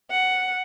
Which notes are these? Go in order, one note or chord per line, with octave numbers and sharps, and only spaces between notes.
F#5